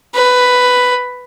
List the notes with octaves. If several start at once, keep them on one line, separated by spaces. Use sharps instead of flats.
B4